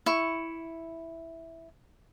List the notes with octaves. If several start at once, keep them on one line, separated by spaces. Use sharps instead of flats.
E4 C#6